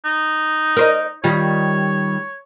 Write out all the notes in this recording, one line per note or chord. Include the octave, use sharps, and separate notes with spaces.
D#4
A#4 C5 D#5
D#3 G3 F4 C#5